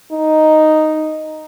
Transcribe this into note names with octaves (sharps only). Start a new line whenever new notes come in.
D#4